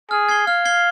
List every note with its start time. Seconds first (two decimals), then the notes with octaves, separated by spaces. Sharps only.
0.11 G#4 F6
0.29 G#6 C7 G7
0.47 F5 F6
0.65 G#6 C7 G7